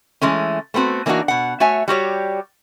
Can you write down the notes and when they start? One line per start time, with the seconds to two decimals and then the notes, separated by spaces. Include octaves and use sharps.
0.21 E3 G#3 A3 C#4
0.74 A3 B3 C4 F#4
1.06 E3 A#3 D4 D#4 F#4
1.28 B2 F#5
1.60 A3 F#4 C#5 E5 G#5
1.88 G3 F#4 G4 C#5